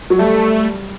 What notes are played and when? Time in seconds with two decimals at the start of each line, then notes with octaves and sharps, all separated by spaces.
0.10 F#3
0.18 G3 A3